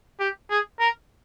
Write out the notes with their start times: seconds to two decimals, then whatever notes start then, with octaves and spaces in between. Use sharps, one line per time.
0.19 G4
0.50 G#4
0.79 A#4